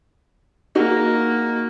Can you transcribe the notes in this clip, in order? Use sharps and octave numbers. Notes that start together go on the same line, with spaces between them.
A#3 D#4 F#4 G#4